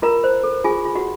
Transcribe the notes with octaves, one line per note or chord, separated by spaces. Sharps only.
F4 A#4 A#5
C5
A4
F4 G#4 G#5
F4
F#4 F#5